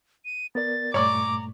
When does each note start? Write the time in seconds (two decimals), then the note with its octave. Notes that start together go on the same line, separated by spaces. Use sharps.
0.25 D#7
0.55 B3 A#4 D5 A6
0.94 G2 A#2 A3 C#5 D5 A#5 D6